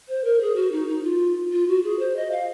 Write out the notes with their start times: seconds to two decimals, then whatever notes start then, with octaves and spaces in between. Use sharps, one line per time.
0.08 C5
0.24 A#4
0.40 G#4
0.55 F#4
0.72 D#4
0.87 D#4
1.03 F4
1.52 F4
1.67 F#4
1.83 G#4
1.99 C5
2.16 D#5
2.31 F5